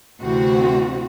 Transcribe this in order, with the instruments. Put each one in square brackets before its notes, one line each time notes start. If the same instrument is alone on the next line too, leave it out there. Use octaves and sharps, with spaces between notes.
[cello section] D2 C3 E3 C4 F#4